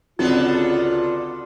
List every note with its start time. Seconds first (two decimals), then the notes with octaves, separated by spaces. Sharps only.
0.19 C#2 D3 F#3 B3 C4 F4 A4